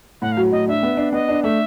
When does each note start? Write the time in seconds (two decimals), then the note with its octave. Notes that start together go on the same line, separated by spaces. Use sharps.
0.22 A2 F#5
0.32 F5
0.37 F#3
0.52 A2 D#5
0.68 D4 E5
0.83 B3
0.97 D4
1.13 B3 D#5
1.29 D4
1.43 A3 E5